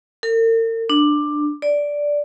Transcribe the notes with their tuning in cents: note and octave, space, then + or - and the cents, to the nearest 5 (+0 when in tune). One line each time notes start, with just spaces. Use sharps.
A#4 -45
D4 +15
D5 -5